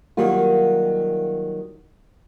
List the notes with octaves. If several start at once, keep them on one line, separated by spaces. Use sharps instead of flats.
D#3 F#3 G3 A#3 F4